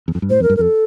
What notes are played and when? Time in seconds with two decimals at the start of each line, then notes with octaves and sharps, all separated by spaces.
0.08 E2
0.15 F2
0.22 G2
0.30 A2 C5
0.40 F2
0.43 A#4
0.50 G2
0.56 A#4
0.59 F2 A4